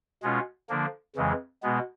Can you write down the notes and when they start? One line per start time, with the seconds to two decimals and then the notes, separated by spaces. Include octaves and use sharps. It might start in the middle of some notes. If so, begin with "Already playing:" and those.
0.23 B2 G#3 C#4 F4
0.69 D3 F3 A#3 D4
1.16 F2 C#3 E3 G#3
1.63 B2 G#3 B3